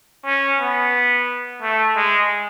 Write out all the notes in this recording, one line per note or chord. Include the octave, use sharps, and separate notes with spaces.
C#4
B3
A3
G#3